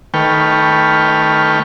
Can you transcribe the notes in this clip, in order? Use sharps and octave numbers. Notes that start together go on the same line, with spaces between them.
D#3 A3 B4 G5 C#6 F6